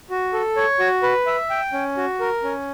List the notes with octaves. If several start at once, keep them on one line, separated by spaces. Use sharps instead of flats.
F#4
A4
C#5
F#4
B4
E5
G5
C#4
F#4
A#4
C#4